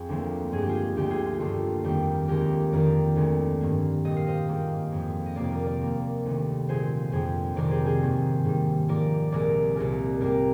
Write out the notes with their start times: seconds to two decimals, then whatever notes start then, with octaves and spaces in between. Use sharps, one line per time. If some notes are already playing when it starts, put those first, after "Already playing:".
Already playing: F2 F4 G#4
0.09 D2 D3 F3 A#3
0.52 G2 F3 G#3 G#4
0.62 G4
0.69 F4 G#4
0.96 D2 D3 G#3 G4
1.11 F4 G#4
1.25 F4
1.40 G2 D3 G3 A#3 F4
1.84 F2 D#3 G3 A#3 G4
2.28 D#2 D3 G#3 G4 A#4
2.73 F2 D#3 A#3 A#4 D5
3.16 D2 D3 G#3
3.60 G2 D#3 A#3
4.05 A#2 G3 A#3 D#5
4.16 F5
4.26 C5 D#5
4.48 G#2 G3 A#3
4.92 F2 D3 F3
5.26 D#5
5.36 F2 C3 D#3 A#3 D5 F5
5.52 A#4 D5
5.66 A#4 D5
5.80 D#2 D#3 A#3
6.25 D2 C3 D#3
6.69 A#2 F3 G#3 G#4 C5
7.12 F2 D3 F3 G#4 C5
7.56 F2 C3 D#3 G#3 A#4 D5
7.71 G#4 C5
7.86 G#4 C5
8.01 G#2 D#3 A#3
8.45 G#2 D#3 G3
8.88 G#2 F3 A#3 A#4 D5
9.32 C2 A#2 G#3 A#4 D5
9.76 C2 A#2 G#3 A#4 D5
10.21 G#2 G3 A#3 A#4 D5